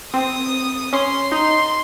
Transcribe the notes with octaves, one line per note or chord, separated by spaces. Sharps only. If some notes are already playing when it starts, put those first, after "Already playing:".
C4 D#6
C#4 C6
D#4 C6